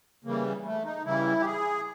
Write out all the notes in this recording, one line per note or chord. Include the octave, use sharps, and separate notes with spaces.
C#3 E3 G3 A#3
A3
D#4
C#3 E3 G3 E4
G4
G#4